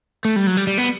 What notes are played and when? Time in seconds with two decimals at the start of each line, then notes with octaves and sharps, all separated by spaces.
0.25 A3
0.36 G3
0.47 F#3
0.57 G3
0.67 G3
0.78 B3